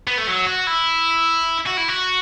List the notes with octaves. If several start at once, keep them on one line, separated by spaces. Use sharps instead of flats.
B3
A3
F#3
F#4
E4
F#4
E4
F#4